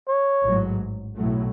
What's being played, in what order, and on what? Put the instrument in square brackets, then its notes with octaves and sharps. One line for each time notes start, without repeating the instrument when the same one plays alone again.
[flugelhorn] C#5
[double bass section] A1 G#2 F#3
B1 A2 F#3 A3